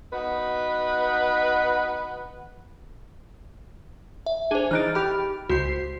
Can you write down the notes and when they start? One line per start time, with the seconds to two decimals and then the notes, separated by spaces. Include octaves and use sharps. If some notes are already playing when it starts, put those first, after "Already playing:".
0.13 B3 D#4 F#4 B4
4.26 E5
4.51 D4 G#4 C5 G#5
4.71 E3 D#4 F6 F#6 A6 D7
4.95 G4 B5 F6
5.49 C#2 F#4 C5 C7